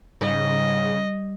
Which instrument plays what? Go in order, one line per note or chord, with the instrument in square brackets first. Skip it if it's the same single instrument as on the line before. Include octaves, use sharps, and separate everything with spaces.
[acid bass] G#2 [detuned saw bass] C#3 [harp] G3 [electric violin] D#5